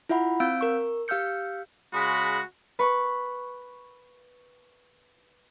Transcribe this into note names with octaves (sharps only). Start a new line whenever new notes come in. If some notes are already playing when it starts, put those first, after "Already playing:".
E4 F4 E5 F#5 B5
C4 F5 E6 G6 D7
A#4 C#6
G4 F5 E6 F6 G6 C#7
C#3 G#3 F#4 B5
B4 B5 C#6